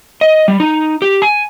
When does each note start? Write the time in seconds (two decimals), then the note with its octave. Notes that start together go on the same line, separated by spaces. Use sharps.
0.21 D#5
0.48 G3
0.60 D#4
1.02 G4
1.22 G#5